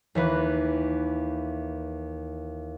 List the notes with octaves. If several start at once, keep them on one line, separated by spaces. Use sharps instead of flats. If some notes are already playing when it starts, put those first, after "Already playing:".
D#2 E3 B4